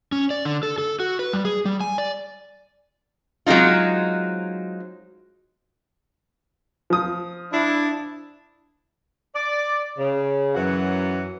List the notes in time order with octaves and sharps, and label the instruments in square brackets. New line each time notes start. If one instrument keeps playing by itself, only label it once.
[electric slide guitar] C#4
D5
D3
A4
A4
F#4
B4
G3
G#4
G3
G#5
D5
[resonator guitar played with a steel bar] F#3 G#3 C4 D#4 F4
[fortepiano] F3 D#6
[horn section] D4 E4
D5
C#3
F#2 E3 F#3 F#4 F#5